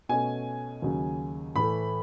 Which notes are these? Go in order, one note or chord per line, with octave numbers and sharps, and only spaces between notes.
B2 A3 C#4 G#5
D#2 C#3 F#3
A2 E3 A3 B5